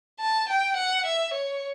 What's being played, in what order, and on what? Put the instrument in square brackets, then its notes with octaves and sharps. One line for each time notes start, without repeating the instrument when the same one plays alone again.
[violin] A5
G5
F#5
E5
C#5